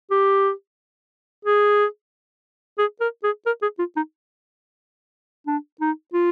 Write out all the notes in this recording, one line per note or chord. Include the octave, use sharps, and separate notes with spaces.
G4
G#4
G#4
A#4
G#4
A#4
G#4
F4
D#4
D4
D#4
F4